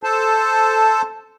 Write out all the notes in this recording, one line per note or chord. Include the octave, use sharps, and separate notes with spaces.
A4 C5 A5